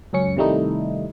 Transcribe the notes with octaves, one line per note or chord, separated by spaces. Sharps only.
C#2 F#2 C#4 C#7
C3 D#3 G3 A3 D#4 E4